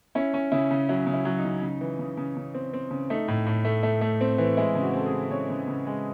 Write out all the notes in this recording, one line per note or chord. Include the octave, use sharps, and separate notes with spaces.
C#4 E4
C#4
C#3 E4
C#3
F#3 E4
C#3
E4
F#3
D#4
C#3
C#3
E3
C#3
C#3
C#3
C4
C4
C#3
A3 D#4
A2
A2
A3
A3
A3
C4
E3
G#3 E4
C#3
F#4
C4 A4
G#4
C#3
C#3 C#5
C#3
C#3
G#3